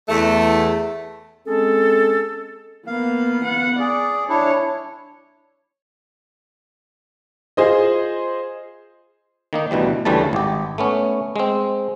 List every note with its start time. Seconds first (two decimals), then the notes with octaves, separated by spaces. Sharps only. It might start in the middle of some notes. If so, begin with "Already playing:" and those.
0.09 E2 A3
1.46 G#3 C4 C#4 G#4 A4
2.87 A#3 B3 F5
3.44 B3 F#5
3.80 G#4 D5
4.29 D4 E4 C#5
7.57 F4 G#4 C5 D#5
9.53 D#3 A#3 D#4
9.71 D2 B2 E3 G3
10.05 D2 C#3 E3 G3 A3 A5
10.33 G#1 G4
10.78 A3 B3 C#4
11.36 G#3 C4